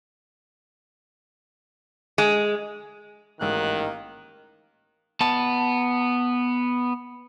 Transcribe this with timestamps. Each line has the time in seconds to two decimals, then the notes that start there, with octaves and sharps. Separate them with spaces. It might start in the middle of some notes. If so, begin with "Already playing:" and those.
2.18 G#3
3.41 A1 G#2 D#3 A#3 F#6
5.21 B3 A5